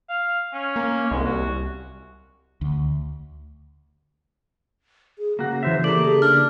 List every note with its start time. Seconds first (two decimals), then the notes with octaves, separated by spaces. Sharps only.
0.09 F5
0.54 C#4
0.76 A#3
1.11 C2 G#3
1.24 F#4
2.61 D2
5.18 G#4
5.39 C#3 A#3 F#4
5.63 E3 C5 E5
5.84 A3 A#3 G4 D5 F#7
6.05 G#4
6.22 D4 F6